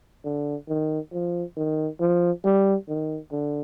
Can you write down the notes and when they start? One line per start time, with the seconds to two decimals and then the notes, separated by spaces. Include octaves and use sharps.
0.25 D3
0.69 D#3
1.13 F3
1.57 D#3
2.00 F3
2.45 G3
2.89 D#3
3.32 D3